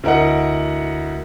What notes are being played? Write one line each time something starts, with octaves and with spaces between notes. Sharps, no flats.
D2 E4 A#4 D#5 F#5